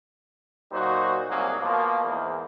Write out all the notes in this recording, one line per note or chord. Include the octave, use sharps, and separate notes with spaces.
A#2 F#3 D#4 F#4 C5
C2 G#2 F#3 A#3 G#4
B2 F3 A#3
E2 G#2 A#3